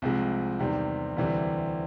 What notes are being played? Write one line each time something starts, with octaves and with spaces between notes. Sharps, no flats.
C2 C3 F3 G#3
E2 C3 D#3 G3
D2 C3 E3 G3